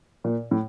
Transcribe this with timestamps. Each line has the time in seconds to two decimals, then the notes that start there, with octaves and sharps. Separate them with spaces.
0.24 A#2
0.51 A2